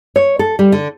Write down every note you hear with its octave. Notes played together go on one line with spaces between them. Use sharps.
C#5
A4
G3
D3